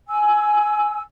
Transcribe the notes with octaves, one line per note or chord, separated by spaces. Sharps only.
G#5 E6